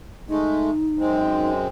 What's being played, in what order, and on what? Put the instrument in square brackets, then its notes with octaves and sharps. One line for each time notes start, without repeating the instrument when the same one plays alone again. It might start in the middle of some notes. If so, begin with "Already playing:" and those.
[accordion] G#3 A3 [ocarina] D#4
[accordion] F#2 G#3 C4